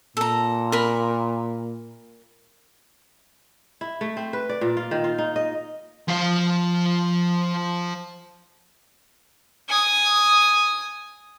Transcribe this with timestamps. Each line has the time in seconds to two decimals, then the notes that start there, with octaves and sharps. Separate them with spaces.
0.17 A#2 A4 A#5
0.72 A#4 B5
3.81 E4
4.01 A3
4.17 C4
4.33 B4
4.49 D5
4.61 A#2
4.77 F4
4.91 D#3
5.04 F4
5.18 D#4
5.36 D#5
6.08 F3 F5
9.69 G#5 D#6